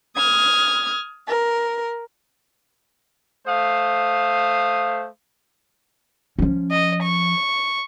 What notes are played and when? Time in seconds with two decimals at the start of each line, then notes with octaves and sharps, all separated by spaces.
0.15 D#6 F6 G#6
1.27 A#4
3.47 A3 C5 F5 D#6
6.39 F3 C#4
6.71 D#5
7.03 C#6